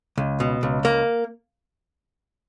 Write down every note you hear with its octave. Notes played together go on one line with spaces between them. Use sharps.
C#2
B2
C#2
A#3